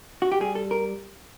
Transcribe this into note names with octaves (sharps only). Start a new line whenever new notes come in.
F#4
G4
G3 G#4
A4
A#4